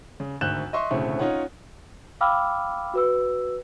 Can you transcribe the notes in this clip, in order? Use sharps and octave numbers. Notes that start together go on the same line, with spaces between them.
C#3
G#1 D2 F#6 G6 E7
D#5 E5 C6 C#6
E1 D2 A2 C#3 A3 C4
C#4 D#4 F4 C#5 F#5
F5 G5 B5 D6 E6 F6
F#4 B4 E6